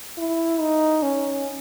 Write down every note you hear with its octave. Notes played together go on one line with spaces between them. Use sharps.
E4
D#4
C#4